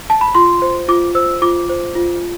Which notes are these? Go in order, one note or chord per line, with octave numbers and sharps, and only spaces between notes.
A5
B5
F4 C6
C5
F4 D6
C5 E6
F4 D6
C5
F4